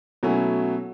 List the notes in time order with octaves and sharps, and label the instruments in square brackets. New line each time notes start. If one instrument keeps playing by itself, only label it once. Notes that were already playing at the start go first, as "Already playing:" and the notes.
[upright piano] B2 F#3 A3 C#4 E4